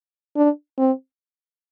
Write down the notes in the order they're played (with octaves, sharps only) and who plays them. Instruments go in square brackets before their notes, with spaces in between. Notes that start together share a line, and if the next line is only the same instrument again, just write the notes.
[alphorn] D4
C4